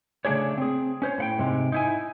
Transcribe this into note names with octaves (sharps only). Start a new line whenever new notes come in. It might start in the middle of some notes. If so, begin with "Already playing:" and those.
C#3 A3 B3 D4 G#4 C#5
C4 G#4
C#4 C5 C#5
A2 F#5 G5
G#2 C3 G#3
D#4 E4 G#5